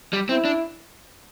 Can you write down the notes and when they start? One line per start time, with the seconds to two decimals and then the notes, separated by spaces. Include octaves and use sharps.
0.13 G3
0.29 C4 E4
0.45 D4